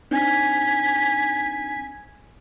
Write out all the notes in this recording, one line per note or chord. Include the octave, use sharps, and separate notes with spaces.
C4 D4 D#4 G#5 B6